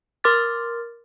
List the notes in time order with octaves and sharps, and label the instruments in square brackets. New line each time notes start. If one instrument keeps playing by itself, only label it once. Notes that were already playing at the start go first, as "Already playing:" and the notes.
[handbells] A#4 C6 D6 F6 A6